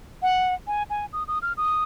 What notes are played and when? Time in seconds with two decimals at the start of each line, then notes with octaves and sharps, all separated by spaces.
0.22 F#5
0.67 G#5
0.90 G#5
1.13 D#6
1.28 D#6
1.42 F6
1.57 D#6